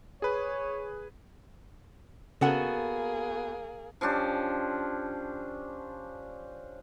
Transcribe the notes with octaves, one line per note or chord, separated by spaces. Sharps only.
G#4 B4 C#5
C#3 A#3 B3 C#4 F#4 G#4 A4 F#5
F3 C#4 D4 G4